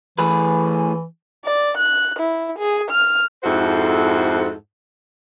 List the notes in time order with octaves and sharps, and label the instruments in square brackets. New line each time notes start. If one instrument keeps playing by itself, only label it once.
[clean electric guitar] A2 G#4 B4 [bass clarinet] E3
[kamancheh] D5
F#6
E4
G#4
F6
[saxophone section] F2 G#2 E4 F#4 A4 C5